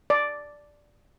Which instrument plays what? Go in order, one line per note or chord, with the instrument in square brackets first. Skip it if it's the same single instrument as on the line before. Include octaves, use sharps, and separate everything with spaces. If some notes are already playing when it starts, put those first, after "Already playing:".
[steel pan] D5